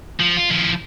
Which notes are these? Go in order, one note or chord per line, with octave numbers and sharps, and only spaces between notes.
F3
F4
F3 E4